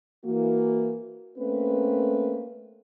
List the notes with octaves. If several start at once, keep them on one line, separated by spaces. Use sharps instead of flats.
E3 A#3 F#4
A3 A#3 C4 C#4 B4